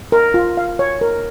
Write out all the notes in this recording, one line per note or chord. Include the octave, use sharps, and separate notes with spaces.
A#4
F4
F5
C#5
A#4